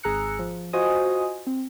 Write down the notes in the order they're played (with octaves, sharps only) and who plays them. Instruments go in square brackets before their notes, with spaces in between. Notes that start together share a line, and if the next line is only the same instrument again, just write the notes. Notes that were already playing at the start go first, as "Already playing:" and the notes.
[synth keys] G#1 G#4 A#5 E6 F#6 C#7
F3
F4 F#4 C5 D#5 G#5 D#6
C4